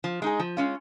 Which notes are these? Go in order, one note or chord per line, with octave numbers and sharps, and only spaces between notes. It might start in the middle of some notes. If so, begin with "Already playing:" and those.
F3
G#3 D#4 G#4
F3
G#3 C#4 F4